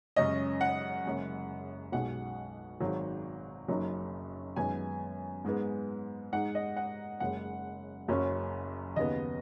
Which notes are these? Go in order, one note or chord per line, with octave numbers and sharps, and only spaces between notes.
F#2 C#3 G#3 C#4 D#5
F#5
F#1 F#2 C#3 G#3
B1 B2 G#3 F#5
G#1 G#2 D#3 F#3
F#1 F#2 F#3 D#4
F#2 D#3 G#3 B3 G#5
G#2 G#3 B3
G#2 G#3 D#4 F#5
D#5
F#5
F#1 F#2 C#3 G#3 F#5
F#1 F#2 F#3 C#4
D#2 C#3 B3 D#5